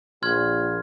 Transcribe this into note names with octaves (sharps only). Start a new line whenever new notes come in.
A#1 C6 F6 G#6